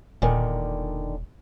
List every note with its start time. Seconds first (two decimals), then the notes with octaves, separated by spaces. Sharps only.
0.22 E1 A#2 D3 D#3